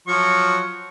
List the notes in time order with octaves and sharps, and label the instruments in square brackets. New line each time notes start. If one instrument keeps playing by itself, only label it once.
[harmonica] F3 F#3 C#6